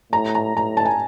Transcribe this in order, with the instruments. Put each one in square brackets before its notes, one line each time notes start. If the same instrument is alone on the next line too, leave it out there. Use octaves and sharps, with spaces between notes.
[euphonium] A2 [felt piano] A#5
[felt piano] A#5
[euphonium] A2 [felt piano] A#5
[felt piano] A5
G#5